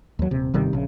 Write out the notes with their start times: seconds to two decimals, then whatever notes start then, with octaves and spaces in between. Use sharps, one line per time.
0.19 D#2 F#3
0.31 D#1 C3
0.54 G1 C3 D#3 G3
0.73 A#1 C#3